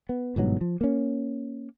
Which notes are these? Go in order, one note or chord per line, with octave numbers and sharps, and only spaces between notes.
B3
G1 G#2 B2 F#3
F3
A#3 C#4